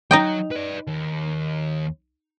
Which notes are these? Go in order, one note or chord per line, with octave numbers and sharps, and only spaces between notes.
F#3 D#4 D#5 G5
B4 D5
D#2